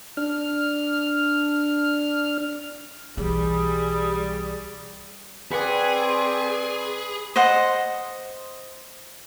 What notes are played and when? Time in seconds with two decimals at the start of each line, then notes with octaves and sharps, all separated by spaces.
0.17 D4 F6
3.17 B1 E3 G3 G#4
5.52 C4 G#4 B4 D5 F#5 G#5
7.36 C5 D#5 F#5